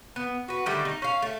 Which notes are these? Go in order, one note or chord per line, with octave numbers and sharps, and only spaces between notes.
B3
F#4 B4
D3 D#3 G3 A3
D#4
C#4 F5
A3